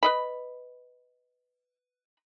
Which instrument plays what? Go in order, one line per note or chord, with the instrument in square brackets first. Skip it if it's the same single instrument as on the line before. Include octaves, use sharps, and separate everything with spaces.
[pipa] B4 D#5 B5